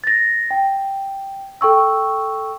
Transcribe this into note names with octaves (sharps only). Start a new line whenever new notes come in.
A6 A#6
G5
A4 G5 C#6 E6